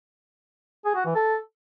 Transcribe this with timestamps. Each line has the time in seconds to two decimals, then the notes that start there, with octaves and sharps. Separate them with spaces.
0.85 G#4
0.95 F#4
1.06 E3
1.16 A4